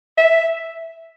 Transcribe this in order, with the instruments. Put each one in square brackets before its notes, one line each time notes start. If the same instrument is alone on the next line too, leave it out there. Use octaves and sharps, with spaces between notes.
[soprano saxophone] E5